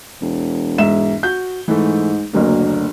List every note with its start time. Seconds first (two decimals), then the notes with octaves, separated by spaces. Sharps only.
0.21 E1
0.78 G#2 E5 E7
1.23 F#4 G6
1.68 G#2 E3 A3
2.34 F#1 D2 F#3 A#3